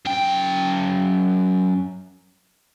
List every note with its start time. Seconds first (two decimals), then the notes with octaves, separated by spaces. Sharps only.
0.05 F#2 G5